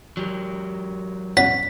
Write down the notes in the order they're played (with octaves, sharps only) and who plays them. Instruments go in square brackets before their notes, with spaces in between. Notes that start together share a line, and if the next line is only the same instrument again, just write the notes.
[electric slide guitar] F#3 G4 A#4
[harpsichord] C#4 F#5 [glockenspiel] B6